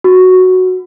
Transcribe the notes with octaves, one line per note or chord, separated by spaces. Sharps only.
F#4